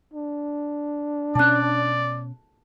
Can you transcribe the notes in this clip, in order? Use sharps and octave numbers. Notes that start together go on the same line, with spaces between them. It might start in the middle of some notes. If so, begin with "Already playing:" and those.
D4
B2 C#4 D5 A5 F#6